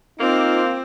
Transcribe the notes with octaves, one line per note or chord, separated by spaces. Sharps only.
A#3 C4 D#4 F4 C5 D6